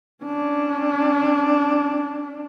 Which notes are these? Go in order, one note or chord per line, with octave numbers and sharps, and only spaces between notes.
C#4 D4